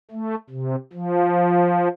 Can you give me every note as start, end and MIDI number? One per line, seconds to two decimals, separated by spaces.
0.11 0.35 57
0.50 0.76 48
0.93 1.88 53